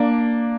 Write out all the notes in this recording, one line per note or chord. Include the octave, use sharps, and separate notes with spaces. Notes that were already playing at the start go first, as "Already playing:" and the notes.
Already playing: A#3 D4